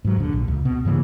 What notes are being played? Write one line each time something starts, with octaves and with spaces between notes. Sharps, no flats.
G#2 F#3
D#1 D3
A#1
C#2
B2
G2 C#3 E3 A#3